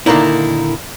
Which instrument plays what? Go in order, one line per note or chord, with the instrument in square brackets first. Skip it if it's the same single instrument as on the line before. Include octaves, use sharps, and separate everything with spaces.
[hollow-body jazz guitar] A#2 D3 D#3 A#3 D#4 E4